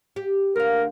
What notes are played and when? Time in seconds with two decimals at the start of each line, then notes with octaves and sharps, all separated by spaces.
0.16 G4
0.56 D2 A#4 F5